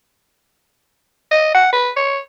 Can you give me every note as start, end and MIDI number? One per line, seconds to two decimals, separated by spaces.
1.31 1.53 75
1.54 1.70 78
1.73 1.90 71
1.96 2.20 73